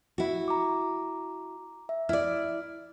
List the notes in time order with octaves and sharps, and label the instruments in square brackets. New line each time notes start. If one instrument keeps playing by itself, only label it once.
[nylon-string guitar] E4 F#4
[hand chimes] A#5 D6
E5
[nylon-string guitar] E4 D5 [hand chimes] F6